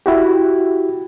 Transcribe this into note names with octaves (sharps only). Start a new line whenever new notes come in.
E4 F#4 G4